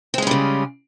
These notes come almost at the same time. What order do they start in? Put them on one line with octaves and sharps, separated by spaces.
C4 G#3 C#4 G3 C#3